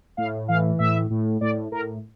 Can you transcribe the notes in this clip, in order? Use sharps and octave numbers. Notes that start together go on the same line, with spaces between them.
A2 F5
E3 F5
A2 E5
A2
A2 D5
A2 A#4